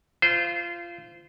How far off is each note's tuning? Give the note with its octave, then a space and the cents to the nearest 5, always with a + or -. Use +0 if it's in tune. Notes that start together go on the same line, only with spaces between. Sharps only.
F4 -20 C5 -20